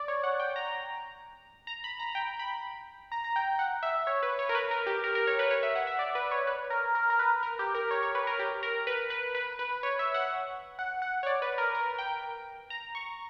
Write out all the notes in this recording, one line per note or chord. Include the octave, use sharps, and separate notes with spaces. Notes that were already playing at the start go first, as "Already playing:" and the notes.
Already playing: D5
C#5
F#5
G5
A#5
A#5
B5
A#5
G5
B5
A#5
A#5
G5
F#5
E5
C#5
B4
C#5
A#4
B4
A#4
G4
A#4
A#4
C#5
B4
C#5
E5
F#5
E5
D5
B4
C#5
B4
A#4
A#4
A#4
B4
A#4
G4
A#4
C#5
C#5
B4
A#4
G4
A#4
B4
B4
B4
B4
C#5
E5
F#5
F#5
F#5
C#5
D5
B4
A#4
A#4
G5
A#5
C#6